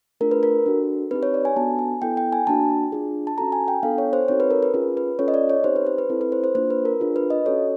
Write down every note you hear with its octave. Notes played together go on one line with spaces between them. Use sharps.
A3 D4 F4 G#4 A#4
B4
A#4
D4 F#4 A4
C4 D#4 G4 B4
C#5
D5
G#5
B3 D4 F#4 A4 A5
G#5
B3 E4 A4 G5
G5
G#5
A#3 D4 F#4 A5
D4 F4 G#4
A5
C#4 F#4 A4 A#5
G#5
G5
B3 D4 F4 A4 F5
C#5
C5
C4 D#4 F#4 A4 C#5
B4
A#4
B4
C#4 F4 G#4 B4
B4
C#4 F4 A4 C#5
D#5
D5
C#5
C4 D#4 G4 C5
B4
C5
B4
C4 E4 A4
B4
C5
C5
A#3 D4 F4 C5
B4
A#4
D4 F4 G#4
B4
D#5
C#4 F#4 A4 C#5